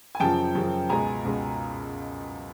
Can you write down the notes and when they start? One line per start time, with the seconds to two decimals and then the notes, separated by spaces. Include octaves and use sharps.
0.15 G#5
0.20 F#2 C#3 F3 G5 A5
0.55 F#2 C#3 F3
0.89 C#2 B2 G#3 G#5 A#5
1.25 C#2 B2 G#3